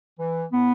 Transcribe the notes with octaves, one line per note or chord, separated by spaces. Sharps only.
E3
A2 B3